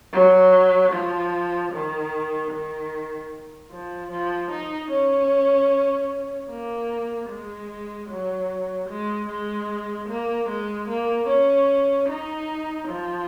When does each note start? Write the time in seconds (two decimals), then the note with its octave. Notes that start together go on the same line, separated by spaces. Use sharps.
0.13 F#3
0.92 F3
1.72 D#3
2.51 D#3
3.71 F3
4.11 F3
4.51 D#4
4.91 C#4
6.50 A#3
7.29 G#3
8.09 F#3
8.88 G#3
9.29 G#3
10.08 A#3
10.48 G#3
10.88 A#3
11.28 C#4
12.08 D#4
12.88 F3